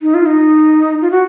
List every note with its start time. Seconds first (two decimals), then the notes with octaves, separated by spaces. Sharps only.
0.02 D#4
0.14 F4
0.26 D#4
1.02 F4
1.11 F#4